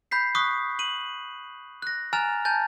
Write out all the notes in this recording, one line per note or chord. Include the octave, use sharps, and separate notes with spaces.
B5 G6 B6 C7
C#6 D#6 F#6 B6
D#7 F#7
F#6 A#6
G#5 A#5 F6 F#6 A6 F7
G#5 A5 G6 A6